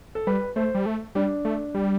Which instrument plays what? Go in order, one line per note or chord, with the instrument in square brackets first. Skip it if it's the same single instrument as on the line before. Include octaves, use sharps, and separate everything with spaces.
[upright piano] A4
[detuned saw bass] G3 [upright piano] B4
[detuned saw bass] A3 [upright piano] C5
[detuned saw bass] G3
A3
[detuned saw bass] G3 [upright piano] D4
[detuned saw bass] A3
G3